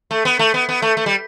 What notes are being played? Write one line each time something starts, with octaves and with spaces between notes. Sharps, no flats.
A3
B3
A3
B3
B3
A3
A3
G3